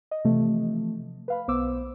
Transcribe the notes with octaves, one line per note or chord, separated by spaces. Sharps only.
D#5
C3 E3 F3 A3
B4 F5 B5
B1 B3 C5 D6 E6